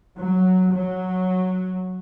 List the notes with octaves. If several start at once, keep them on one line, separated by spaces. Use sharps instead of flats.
F#3
F#3